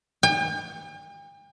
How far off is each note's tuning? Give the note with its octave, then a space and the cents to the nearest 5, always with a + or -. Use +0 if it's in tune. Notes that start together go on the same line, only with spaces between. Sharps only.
G5 +40